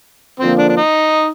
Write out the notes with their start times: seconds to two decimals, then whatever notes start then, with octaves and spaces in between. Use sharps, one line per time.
0.40 F2 D3 F3 A#3 C4
0.58 D4
0.69 D4
0.77 D#4